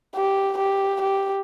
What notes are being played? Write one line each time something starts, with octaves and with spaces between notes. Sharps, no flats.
G4
G4
G4